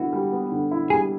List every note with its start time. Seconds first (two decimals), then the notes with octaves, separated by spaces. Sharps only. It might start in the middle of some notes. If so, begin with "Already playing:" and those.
Already playing: D3 G3 B3 E4 F#4
0.13 G3
0.32 B3
0.52 D3
0.71 E4
0.90 G3 G#4